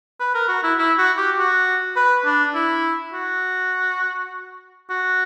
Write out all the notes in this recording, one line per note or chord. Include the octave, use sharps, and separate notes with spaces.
B4
A#4
F#4
E4
E4
F#4
G4
F#4
B4
D4
E4
F#4
F#4